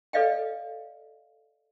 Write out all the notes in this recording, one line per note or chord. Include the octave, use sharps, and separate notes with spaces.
A4 B4 D5 D#5 F5 G5